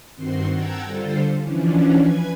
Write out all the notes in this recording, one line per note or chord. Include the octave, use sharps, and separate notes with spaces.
G2 D#3 C4 F#4 C6
F#5 G5 A5 A#5 E6 G#6
D3 G3 F4 A4 C5
E3 F3 C#4 D4
B4 G#5 G#6